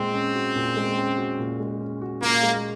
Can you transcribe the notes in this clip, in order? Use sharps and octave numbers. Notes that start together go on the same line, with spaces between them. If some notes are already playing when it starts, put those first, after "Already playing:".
Already playing: A#2 G#3 C4
C#4
F#4
A#2
G#3
C#4
F#4
A#2
G#3
C#4
F#4
A#2 A#3
G#3